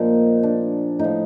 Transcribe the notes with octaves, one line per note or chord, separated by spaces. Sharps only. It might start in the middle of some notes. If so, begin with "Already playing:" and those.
Already playing: A#2 F3 D#4
D4
A2 F3 D#4